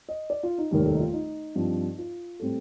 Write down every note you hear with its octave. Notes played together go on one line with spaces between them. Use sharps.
D#5
D5
F4
D#4
F1 D#2 D#3 G3 A#4
A4
D#4
F4
D#4
G2 F3 C4
F4
A2 G3 C4 A4